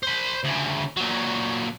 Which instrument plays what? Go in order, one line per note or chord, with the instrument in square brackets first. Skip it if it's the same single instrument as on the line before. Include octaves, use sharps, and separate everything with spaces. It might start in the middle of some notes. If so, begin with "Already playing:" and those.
[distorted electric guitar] C5 B5
D2 C#3
A#2 F#3